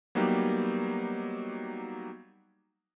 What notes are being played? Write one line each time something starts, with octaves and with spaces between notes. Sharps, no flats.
F#3 G3 A#3 B3 D#4 G4